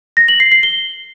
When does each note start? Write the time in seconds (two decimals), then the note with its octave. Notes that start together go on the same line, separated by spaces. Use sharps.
0.17 A#6
0.28 F#7
0.40 C7
0.52 C7
0.63 G7